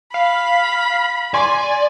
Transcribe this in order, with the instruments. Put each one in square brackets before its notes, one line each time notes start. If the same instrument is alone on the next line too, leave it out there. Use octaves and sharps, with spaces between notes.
[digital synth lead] F5 [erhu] B5
[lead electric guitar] D5 [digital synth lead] G#5 [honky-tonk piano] C6